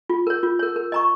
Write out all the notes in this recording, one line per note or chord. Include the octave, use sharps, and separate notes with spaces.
F4
A#4 C#5
F4
A#4 C#5
A#4
D#5 A#5 C#6